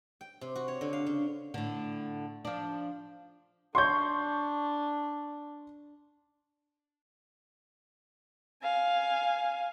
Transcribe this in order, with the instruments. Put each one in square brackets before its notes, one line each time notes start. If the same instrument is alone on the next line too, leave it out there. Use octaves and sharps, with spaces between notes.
[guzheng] G5
C3
F#4
C#5
D3
F5
C#3
[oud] A2 D3
F3 D4
[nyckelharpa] D4 [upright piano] C6 C#6 G6
[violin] F5 G#5